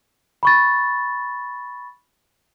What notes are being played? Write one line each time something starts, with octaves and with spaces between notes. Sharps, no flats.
B5 C#6 A6